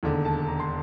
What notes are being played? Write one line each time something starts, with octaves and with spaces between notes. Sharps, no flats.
E1 D#2 D3
A5
A#5
C6